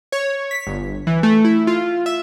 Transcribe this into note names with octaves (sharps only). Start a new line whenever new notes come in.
C#5
B6
G1
E3
A3
E4
F4
E5